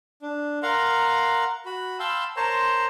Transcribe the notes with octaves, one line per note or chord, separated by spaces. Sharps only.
D4
A#4 F5 F#5 A#5 C6
F#4 B5
F5 G5 A5 B5 C6 E6
A#4 C5 C#5 A5 A#5 C6